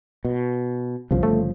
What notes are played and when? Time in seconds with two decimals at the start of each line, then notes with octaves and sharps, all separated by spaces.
0.25 B2
1.11 G1 C2 C#3 F3
1.23 A3